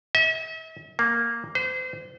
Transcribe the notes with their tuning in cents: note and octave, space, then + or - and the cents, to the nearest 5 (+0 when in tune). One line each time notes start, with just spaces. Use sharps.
E5 -45
A#3 +0
C5 -35